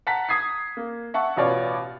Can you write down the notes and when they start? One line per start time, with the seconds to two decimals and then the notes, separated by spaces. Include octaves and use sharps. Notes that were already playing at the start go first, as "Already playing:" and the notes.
0.07 F#5 A5 A#5 B6
0.29 D#6 G#6 B6 C7
0.77 A#3
1.14 E5 F#5 A5 C#6
1.37 A1 B2 F4 C#5 D5 C#6